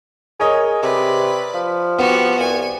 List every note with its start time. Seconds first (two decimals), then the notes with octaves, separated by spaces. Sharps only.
0.40 G#4 A#4 C#5 D#5
0.83 C3 B4 D5
1.54 F3
1.98 B3 F#4 G4
2.39 C2 G#5